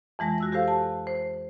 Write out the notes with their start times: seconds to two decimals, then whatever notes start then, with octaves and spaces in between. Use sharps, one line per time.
0.19 F2 E3 G#3 A#6
0.38 F#4 E6 A#6
0.52 F#4 G4 A4 C5 F5
0.68 A5
1.07 C5